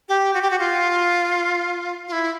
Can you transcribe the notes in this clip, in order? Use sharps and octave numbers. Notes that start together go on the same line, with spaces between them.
G4
F#4
G4
F#4
F4
F4
E4